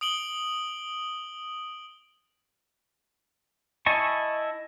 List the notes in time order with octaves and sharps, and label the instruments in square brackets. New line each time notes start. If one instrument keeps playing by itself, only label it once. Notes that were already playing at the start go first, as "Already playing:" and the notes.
[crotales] D#6 D7 F#7 G7
[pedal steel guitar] E4 D#5 G#5 A5 C#6